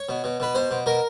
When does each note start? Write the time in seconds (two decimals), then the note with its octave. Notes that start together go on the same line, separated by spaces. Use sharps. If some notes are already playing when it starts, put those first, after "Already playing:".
Already playing: C#5
0.09 B2
0.24 B2
0.40 B2 B4
0.54 B2 C5
0.71 B2
0.86 B2 A#4